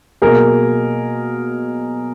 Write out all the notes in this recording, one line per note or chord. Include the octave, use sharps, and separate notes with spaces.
B2 F#3 A#3 G#4 A#4